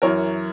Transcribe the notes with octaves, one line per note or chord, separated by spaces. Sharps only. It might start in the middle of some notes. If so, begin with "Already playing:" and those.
F#2 E3 A#4 C#5